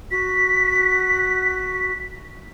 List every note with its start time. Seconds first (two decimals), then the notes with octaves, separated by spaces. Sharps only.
0.11 F#4 B6